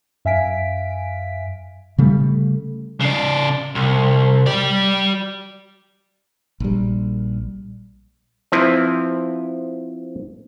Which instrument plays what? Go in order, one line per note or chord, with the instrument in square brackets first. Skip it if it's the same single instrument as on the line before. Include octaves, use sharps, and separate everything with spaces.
[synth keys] F#2 E5 F5 G#5 B6 D7
[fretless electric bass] C#3 G3 A3
[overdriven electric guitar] C#3 D5
C2
G4 D5
[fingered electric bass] A#1 G3
[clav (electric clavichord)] F3 C4 E4 B4